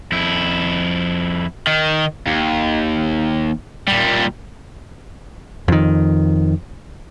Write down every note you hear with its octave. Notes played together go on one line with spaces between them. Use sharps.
F2 E4
D#3
D#2
A#2 G3
F2 D#3